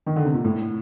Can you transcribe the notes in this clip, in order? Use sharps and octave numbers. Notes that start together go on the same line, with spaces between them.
D#3
D3
C3
A#2
A2